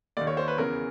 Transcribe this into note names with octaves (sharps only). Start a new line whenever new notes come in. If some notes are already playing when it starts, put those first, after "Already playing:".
D#2 D#3 D5
C#5
C5
B4
E2 C#3 E3 A#4